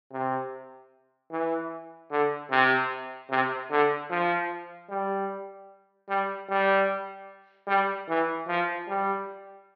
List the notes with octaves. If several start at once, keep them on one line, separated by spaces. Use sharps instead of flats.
C3
E3
D3
C3
C3
D3
F3
G3
G3
G3
G3
E3
F3
G3